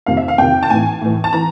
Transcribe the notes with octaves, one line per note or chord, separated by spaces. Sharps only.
F2 C3 D#3 F5
E5
F5
F2 C3 D#3 G5
A5
A2 E3 G#5
A2 E3
A5
E3 A#5